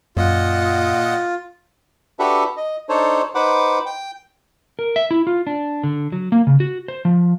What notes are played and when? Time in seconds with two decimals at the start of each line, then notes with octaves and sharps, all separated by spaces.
0.17 F#2 A#2 F4 D#5 F#5
2.19 D4 F#4 G4 A4 B4 E5
2.57 D#5
2.89 D4 D#4 A4 C5 C#5
3.35 D#4 B4 C5 F#5 D6
3.86 G5
4.79 A#4
4.96 E5
5.11 E4
5.27 F4
5.47 D4
5.83 D3
6.12 F#3
6.32 A#3
6.47 C#3
6.60 F#4
6.88 C5
7.05 F3